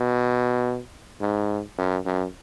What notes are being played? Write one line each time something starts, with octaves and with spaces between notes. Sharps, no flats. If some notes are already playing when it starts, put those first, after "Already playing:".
Already playing: B2
G#2
F#2
F#2